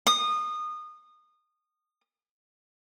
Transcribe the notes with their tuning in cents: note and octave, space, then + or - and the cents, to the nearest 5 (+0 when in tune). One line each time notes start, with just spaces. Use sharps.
D#6 -25